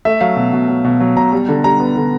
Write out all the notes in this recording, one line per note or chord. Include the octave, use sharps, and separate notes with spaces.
A3 E5
F#3 F5
B2
B2
F#3
B2
F#3
B2 A#5
G3
D3
G3 A#5
B3
D3